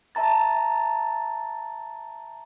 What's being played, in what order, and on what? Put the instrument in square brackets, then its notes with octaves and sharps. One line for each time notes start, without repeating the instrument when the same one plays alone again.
[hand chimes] E5 A5 A#5 A6